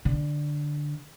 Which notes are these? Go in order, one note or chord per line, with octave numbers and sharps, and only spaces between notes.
D3